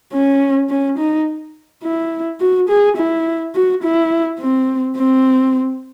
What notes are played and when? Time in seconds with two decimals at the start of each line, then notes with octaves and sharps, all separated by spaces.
0.13 C#4
0.70 C#4
0.98 D#4
1.83 E4
2.40 F#4
2.69 G#4
2.97 E4
3.55 F#4
3.83 E4
4.40 C4
4.97 C4